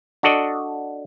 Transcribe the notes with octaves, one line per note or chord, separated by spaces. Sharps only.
D4 F#4 A4 D5 D#5